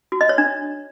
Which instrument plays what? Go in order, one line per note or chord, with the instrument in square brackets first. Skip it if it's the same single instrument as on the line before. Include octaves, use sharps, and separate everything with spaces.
[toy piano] F#4
D#5
C#5
D4